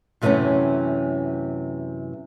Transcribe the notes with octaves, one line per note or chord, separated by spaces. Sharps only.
F#2 C3 E3 G3 A3 C#4